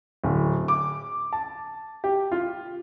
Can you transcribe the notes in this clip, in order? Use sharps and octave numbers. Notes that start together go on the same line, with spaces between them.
D1
D6
A5
G4
F4